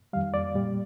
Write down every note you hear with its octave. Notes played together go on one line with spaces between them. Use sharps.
F2 D#3 G3 F5
D5
A#2 G3